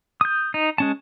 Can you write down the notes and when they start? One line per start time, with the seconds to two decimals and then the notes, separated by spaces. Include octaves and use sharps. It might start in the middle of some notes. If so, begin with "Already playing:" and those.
0.21 D#6 G6
0.54 D#4
0.78 G#3 C#4 A5